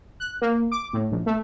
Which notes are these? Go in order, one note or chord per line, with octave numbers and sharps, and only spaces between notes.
F#6
A#3
D6
A2
A#1
A3